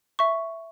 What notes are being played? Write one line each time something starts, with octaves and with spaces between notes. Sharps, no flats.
E5 C#6